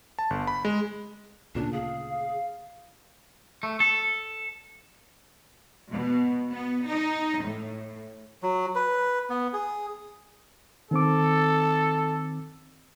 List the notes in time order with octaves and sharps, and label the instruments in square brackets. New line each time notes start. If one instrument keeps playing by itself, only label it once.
[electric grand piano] A5
G1
B5
G#3
[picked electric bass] D2 A#2 C#3 [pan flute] D4
[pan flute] G#4 [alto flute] F5
[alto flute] F5
[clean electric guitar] A3
A4
[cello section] B2
B3
D#4
A2
[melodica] F#3
B4
B3
G#4
[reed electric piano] D#3 C4 D6 [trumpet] A4